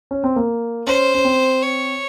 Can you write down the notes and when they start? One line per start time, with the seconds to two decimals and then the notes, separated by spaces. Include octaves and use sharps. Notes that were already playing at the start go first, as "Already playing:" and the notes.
0.11 C#4
0.24 C4
0.36 A#3
0.87 C#4 C5
1.15 C#4
1.25 C4
1.62 C#5